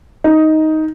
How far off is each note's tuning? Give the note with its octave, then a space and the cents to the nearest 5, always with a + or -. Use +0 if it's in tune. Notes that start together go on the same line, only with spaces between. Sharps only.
D#4 +10